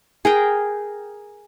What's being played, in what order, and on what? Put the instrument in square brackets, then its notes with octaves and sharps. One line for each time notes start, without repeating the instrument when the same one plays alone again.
[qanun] G#4 A#4 G5